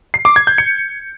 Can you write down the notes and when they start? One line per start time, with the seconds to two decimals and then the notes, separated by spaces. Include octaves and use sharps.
0.14 C7
0.25 D6
0.36 G#6
0.47 G6
0.58 C#7